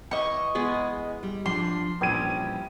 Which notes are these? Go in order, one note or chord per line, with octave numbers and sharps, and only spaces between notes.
E3 D#5 C#6
G#3 B3 G#4
G3
F3 D4 C6
A#1 E3 G3 C#4 G#6 D#7